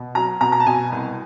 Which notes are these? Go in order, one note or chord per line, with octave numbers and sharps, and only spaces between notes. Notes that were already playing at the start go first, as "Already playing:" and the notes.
Already playing: B2
F#3 A#5
B2 A#5
A#5
A5
B2 G#5
C2